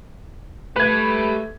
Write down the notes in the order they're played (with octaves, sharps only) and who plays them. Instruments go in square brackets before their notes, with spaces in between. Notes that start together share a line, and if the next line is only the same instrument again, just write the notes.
[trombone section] A3 [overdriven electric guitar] G4 B5 [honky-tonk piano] B4 G#6